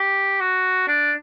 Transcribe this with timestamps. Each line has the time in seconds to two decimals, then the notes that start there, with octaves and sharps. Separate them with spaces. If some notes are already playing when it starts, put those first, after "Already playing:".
Already playing: G4
0.40 F#4
0.88 D4